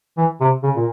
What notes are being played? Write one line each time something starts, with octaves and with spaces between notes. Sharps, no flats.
E3
C3
C#3
A#2